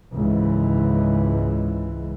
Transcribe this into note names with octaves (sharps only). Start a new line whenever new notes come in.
C#2 G#2 E3